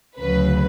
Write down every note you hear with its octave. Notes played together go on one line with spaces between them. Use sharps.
D2 C#3 F#3 B4